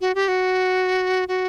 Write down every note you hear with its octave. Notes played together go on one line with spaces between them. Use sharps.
F#4
G4
F#4
F#4